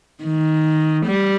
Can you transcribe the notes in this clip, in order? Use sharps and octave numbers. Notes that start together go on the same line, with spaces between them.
D#3
G3